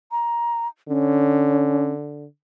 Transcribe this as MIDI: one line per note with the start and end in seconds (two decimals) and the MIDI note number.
0.11 0.67 82
0.88 2.25 50
0.88 1.91 61